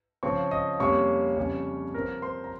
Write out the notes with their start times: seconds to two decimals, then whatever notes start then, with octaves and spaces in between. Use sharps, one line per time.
0.23 C#3 F3 C4 C#5 C#6
0.51 D#5 D#6
0.80 F2 C3 G3 A#3 C#4 C#5 C#6
1.37 F2 C#3 G3 C#4
1.94 C3 F3 C4 A#4 A#5
2.22 C5 C6
2.44 A#5